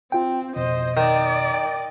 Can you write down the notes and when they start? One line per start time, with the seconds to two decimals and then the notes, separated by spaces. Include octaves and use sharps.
0.12 C4 F4 G5
0.56 F2 B2 C5 D#5
0.97 D#3 D5 D#5
1.54 G5